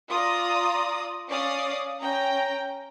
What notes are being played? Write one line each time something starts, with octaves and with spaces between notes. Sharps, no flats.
F4 D5 A#5 D#6
C#4 D5 F5 D#6 C7
C#4 G5 A#5